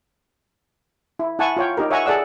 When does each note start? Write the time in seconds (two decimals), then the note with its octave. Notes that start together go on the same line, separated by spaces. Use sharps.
1.19 E4
1.39 E4 F#5 G#5 A5 C#6
1.57 F4 C#5 G5
1.77 D#4 G4 A#4
1.91 C#5 E5 F#5 G#5 A#5 C#6
2.06 G#4 A4 D5 F#5 E6